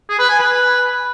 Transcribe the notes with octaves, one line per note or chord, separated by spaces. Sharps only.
G#4
B4
G#5
B4